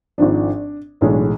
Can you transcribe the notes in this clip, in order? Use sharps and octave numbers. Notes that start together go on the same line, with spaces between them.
G#1 G#2 F3 D4
B1 A2 E3 G#3 D4